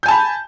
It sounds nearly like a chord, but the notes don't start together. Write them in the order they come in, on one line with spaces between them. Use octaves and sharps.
G6 G#5 A5 B5